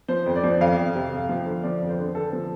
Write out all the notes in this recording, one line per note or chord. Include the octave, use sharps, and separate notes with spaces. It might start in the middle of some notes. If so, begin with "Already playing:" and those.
F3 C5
F2
D5
F3
F2 F5
F2
C3
F2
F3
D3
F3 D5
F2
C5
D3
D3 A4
F3